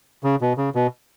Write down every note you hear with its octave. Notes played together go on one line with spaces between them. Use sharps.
C#3
B2
C#3
B2